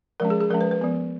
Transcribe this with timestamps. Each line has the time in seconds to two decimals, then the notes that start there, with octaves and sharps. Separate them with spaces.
0.20 F3 G#3 C#4 A#4
0.30 G#4
0.40 G#4
0.50 F3 G#3 C#4 A#4
0.61 B4
0.71 B4
0.81 F3 B3